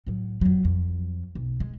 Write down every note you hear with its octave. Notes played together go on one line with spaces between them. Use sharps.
A2 F#3
F2 F#3
F2
B1
G#3